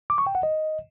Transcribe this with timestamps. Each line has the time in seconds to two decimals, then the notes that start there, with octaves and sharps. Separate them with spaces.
0.10 D6
0.18 C#6
0.27 G5
0.35 F#5
0.43 D#5